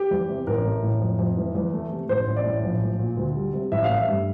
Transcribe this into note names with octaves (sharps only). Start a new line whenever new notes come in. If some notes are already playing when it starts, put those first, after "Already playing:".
Already playing: G4
E2
C3
A1 A#4
A3
A2
F2
F2
E3
E2
A3
C3
A1 C5
A1
D5
A2
A#1
A#1
A#2
D2
G3
C3
A1 E5
F5
A3
E5
G2